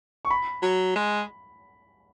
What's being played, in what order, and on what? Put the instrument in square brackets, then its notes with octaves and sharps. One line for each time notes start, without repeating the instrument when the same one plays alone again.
[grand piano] C#6
B5
[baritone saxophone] F#3
G#3